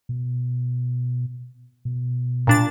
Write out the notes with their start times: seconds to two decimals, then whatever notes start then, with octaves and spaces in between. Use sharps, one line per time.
0.09 B2
1.85 B2
2.47 A#2 D4 A6